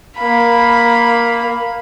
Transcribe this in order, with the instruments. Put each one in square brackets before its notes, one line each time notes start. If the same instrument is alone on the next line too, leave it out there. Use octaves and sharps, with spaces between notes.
[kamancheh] A#3 B5